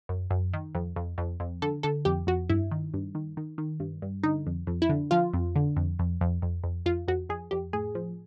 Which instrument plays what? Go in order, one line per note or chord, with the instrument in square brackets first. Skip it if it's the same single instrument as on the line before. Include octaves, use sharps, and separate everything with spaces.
[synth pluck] F#2
F#2
D#3
F2
F2
F2
F2
D3 A4
D3 A4
F2 G4
F2 F#4
G2 E4
D#3
G2
D#3
D#3
D#3
G2
G2
D3 D#4
F2
F2
E4
D3
F3 F4
F2
D3
F2
F2
F2
F2
F2
F2 F4
F2 F#4
F2 G#4
F2 G4
A2 G#4
F3